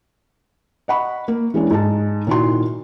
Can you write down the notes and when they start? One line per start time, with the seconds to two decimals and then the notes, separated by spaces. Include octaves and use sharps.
0.88 D#5 F#5 B5 C#6
1.28 A#3
1.54 E3 G#3 C#4 D4
1.71 G#2 G#3 D#4 A5
2.27 A#2 D#3 E4 F#4 C6